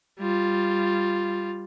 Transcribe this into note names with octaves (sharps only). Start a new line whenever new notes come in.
G3 F4